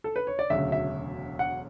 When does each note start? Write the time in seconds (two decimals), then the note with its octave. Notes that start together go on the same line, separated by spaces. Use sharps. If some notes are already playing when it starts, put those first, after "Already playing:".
0.04 A4
0.16 B4
0.27 C#5
0.39 D5
0.50 E1 D2 C#3 F#3 E5
0.72 E5
1.39 F#5